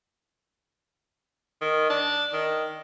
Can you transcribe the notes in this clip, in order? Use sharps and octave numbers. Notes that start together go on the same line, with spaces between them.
D#3
D4
D#3